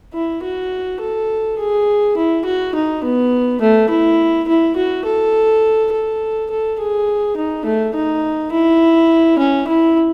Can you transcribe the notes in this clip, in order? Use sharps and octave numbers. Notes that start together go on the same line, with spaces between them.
E4
F#4
A4
G#4
E4
F#4
D#4
B3
A3
E4
E4
F#4
A4
A4
A4
G#4
D#4
A3
D#4
E4
C#4
E4